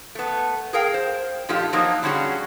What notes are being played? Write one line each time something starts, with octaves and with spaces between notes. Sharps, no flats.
A3 B3
G#4 A#4 F5 G5
C5
A#2 F3 A3 D#4 F4 G4
F3 F#3 A#3 D#4
D3 G3 C#4 F#4 G#4